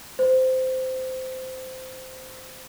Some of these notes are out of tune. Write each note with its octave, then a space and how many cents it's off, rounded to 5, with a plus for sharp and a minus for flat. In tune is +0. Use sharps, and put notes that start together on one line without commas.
C5 -15